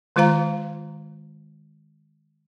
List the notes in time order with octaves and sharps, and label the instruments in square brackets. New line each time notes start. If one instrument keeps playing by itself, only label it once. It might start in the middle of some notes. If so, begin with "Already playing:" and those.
[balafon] D#3 G#3 F4 C5 F5 A#5